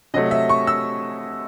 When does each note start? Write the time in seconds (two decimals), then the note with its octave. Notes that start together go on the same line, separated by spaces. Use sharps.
0.14 C3 F#3 A3 D#5
0.31 E5
0.49 C#6
0.67 E6